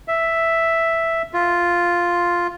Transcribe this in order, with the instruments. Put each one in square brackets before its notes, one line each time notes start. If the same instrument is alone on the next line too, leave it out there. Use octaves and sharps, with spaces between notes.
[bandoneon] E5
F4